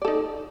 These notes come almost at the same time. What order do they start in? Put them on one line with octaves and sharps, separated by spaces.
D5 A4 D#4